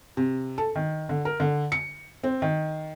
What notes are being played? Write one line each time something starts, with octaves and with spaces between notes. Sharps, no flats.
C3
A4
D#3
D3
A#4
D3
C#7
C4
D#3